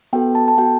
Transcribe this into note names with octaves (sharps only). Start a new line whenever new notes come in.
B3 F#4 A4 G5
A5
A5
B3 F#4 A4 G5